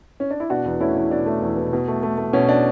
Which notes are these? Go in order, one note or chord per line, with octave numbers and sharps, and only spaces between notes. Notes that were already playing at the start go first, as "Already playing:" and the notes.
C#4
D4
E4
B2 D4 F#4
E2
A3 C#4 E4
E2
B2 D4
A3
E2
B2
B2
A3
A3
A3
B2 C#4
D4